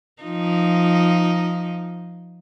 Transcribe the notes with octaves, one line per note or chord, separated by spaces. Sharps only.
F3 D#4